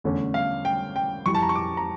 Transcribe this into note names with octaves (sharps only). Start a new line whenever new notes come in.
E2 D3 A3 C#4
F5
G5
G5
F2 E3 G3 C#6
A5
A#5
C#6
D6
A#5